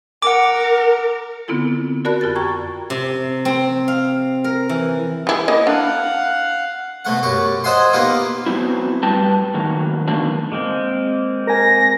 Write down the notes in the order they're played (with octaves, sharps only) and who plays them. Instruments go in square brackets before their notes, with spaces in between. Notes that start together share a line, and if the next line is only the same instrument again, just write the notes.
[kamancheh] A#4 [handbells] F#5 D6
[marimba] D3 B3 C4 E4 F4 A4
F#4 A#4 D5 A5 B5 F#6
F2 F4 G4 A6
G5 A#5 C#6 G#6
[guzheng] C3
C4
F5
A#4
E3
[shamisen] G3 E4 G#4
[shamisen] A#3 D#5 [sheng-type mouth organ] E4
[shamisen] D4 [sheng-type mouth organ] F5 F#5
[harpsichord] B2 A3 F#5
F#2 G4 C#6
C5 D#5 E5 F#5 G#5 C6
A#3 B3 D#4 F4 G4
[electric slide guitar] F#3 B3 C4 E4
A2 G3 B4 G5 A5
F#2 A2 D#3 F#3 A#3
B2 D3 D#3 A3 A#3 D4
[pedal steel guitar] G#3 A#3 C4
[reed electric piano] A#4 G#5 [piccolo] A#6